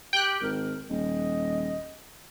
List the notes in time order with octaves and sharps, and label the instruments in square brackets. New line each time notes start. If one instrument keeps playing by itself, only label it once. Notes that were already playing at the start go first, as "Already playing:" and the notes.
[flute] G4 [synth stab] G5 F#6
[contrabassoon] G#1 [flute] A#4
[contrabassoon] D#1 [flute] D#5